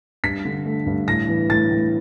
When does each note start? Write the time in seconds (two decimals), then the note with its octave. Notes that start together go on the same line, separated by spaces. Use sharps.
0.23 G2 B6
0.45 D3
0.66 A3
0.86 G2
1.08 A2 A#6
1.29 E3
1.50 A2 A6
1.71 A2